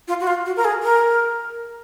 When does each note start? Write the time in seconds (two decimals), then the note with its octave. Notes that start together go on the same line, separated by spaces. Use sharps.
0.08 F4
0.20 F#4
0.27 F4
0.46 F#4
0.56 A#4
0.65 G#4
0.83 A#4